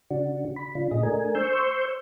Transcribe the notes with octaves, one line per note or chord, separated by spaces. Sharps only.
C#3 D4 F#4
B5
C#3 D4 F4
A#2 G#4 D#5
A3 D4 A#4 G#5
C5 C6 C#6 E6 G6